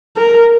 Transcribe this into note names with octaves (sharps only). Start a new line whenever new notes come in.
A#4